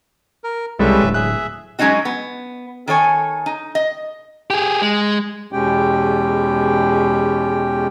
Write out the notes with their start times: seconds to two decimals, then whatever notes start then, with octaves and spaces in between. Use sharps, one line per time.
0.44 A#4
0.79 C2 G3 G#3 C#4 A4 B4 E5
1.01 D1
1.14 G#4 E5 F#6
1.79 F#3 G#3 A#3 C#4 D#4 F#4
2.05 B3
2.88 D#3 A4 C#5 G#5
3.46 D#4
3.75 D#5
4.50 G4 G#4
4.82 G#3
5.53 E2 B2 G#3 C#4 G4 G5